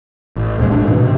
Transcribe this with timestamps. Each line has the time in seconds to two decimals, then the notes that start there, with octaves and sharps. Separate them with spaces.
0.36 A1
0.58 D#1 G2 C3 G#3
0.71 F#1 F#2 A2 D4
0.87 G#2 B2 D#3 E3
1.03 C3